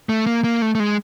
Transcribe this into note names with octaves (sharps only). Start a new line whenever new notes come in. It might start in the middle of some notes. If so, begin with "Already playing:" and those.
A3
A#3
A#3
A3
A3
G#3